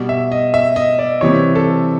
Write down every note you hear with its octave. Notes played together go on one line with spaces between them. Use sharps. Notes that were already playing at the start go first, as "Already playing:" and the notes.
Already playing: B2 G3
E5
D#5
E5
D#5
D5
C3 E3 G3 C#5
A4